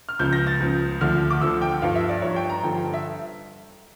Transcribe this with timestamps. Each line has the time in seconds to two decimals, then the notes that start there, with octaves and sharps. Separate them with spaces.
0.09 F6
0.19 C#2 C#3 F3 G6
0.33 A#6
0.47 A6
0.60 C#2 C#3 F3
1.01 D2 D3 F3 F6
1.30 D6
1.41 D2 D3 F3 E6
1.62 G5
1.82 G2 F3 F5
1.95 E5
2.09 D5
2.22 G2 F3 C#5
2.36 G5
2.50 A#5
2.63 G2 D3 F3 G5
2.94 E5